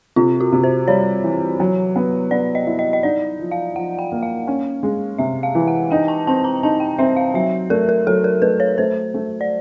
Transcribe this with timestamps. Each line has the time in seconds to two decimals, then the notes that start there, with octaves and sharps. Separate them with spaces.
0.16 C3 F4
0.40 F#4
0.52 C3
0.64 C5
0.88 G3 C#5
1.24 E3
1.60 F#3
1.96 B3
2.31 B3 D5
2.55 D#5
2.67 E4
2.79 D#5
2.93 D#5
3.03 D#4 D5
3.40 F3
3.51 F5
3.75 F3 F#5
3.99 G5
4.12 A#3
4.23 F5
4.47 C#4
4.83 G#3
5.19 C3 E5
5.43 F5
5.55 E3
5.68 F#5
5.91 D#4 G5
6.08 A5
6.27 C4 A5
6.44 A#5
6.63 D#4 A5
6.80 G5
6.98 C4 E5
7.16 F5
7.34 F#3 E5
7.70 A3 A#4
7.89 A#4
8.07 F#3 A4
8.24 A#4
8.42 A3 B4
8.60 C#5
8.78 A3 C5
9.14 A3
9.41 D5